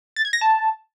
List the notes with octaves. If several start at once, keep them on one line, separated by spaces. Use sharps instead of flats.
A6
G#6
A#6
A5